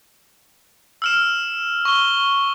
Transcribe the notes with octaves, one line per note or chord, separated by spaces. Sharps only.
E6 F6 E7
C#6 G7